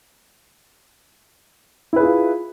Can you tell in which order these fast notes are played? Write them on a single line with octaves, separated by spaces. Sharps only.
E4 B4 G#4 F4